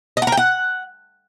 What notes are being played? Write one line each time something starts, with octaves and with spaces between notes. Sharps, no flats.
D#5
F#5
A#4
G5
F#5